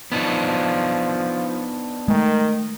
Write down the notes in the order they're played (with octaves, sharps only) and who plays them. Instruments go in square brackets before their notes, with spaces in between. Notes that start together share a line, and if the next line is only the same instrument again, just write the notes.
[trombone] F3 [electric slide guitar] B3 D4 D#4
[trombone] D#3 [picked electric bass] G#3 A3